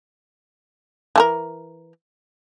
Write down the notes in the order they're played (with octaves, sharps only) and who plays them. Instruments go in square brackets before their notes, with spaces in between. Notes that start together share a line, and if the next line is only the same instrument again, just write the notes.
[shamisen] E3 A4 A#4